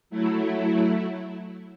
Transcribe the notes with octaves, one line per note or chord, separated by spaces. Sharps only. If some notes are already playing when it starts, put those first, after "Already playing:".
F#3 A3 E4